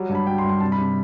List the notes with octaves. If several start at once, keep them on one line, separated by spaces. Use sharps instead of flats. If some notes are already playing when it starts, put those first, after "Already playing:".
Already playing: F#3 G3
G2
B5
F#3 G5
C6
G2
C6
C3 A5
B5
C3